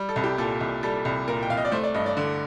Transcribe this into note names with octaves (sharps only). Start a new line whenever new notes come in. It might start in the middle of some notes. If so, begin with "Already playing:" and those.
Already playing: G3
A4
C2
G4
A#2 A4
C2
G3 A4
C2
A#2 A#4
G5
C2 F5
D#5
D5
A3 C5
D5
G2 D#5
D5
D3